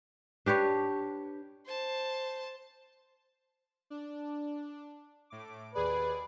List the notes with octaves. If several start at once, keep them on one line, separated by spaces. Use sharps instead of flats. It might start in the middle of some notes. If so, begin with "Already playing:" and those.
D4 G4 B4 C#5
C5 A5
D4
A2 D6
D#2 G#4 B4 D5